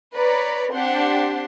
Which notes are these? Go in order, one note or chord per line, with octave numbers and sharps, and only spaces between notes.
B4 C#5 D5 A#5 B5
C4 D4 G4 F#5 C6